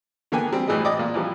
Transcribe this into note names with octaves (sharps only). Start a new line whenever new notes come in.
D3 A#3 B3 G5 G#5
G3 C4
A2 E3 G3 G#3 D#5
D5 D#5 G5 D6 D#6
A#2
E3 F3 G3